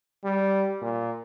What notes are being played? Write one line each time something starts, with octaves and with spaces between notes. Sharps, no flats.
G3
A#2